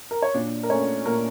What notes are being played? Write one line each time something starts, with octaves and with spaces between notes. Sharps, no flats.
A#4
C#5
A#2 D4 D5
A#4
A3 C#4 C#5
A#2 A#3 A#4